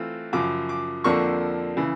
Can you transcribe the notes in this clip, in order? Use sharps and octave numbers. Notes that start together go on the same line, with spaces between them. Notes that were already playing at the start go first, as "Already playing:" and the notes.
Already playing: E3 A3 C4 F4
F#2 C#3 F3 D6
D6
F2 D3 F3 A#3 D4 C#6
C#3 E3